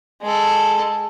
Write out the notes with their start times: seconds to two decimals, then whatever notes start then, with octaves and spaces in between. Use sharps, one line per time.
0.22 G#3 A4